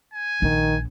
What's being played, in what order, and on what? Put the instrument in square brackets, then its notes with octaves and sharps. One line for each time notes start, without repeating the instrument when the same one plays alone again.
[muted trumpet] G#5
[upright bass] A#1 [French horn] D#3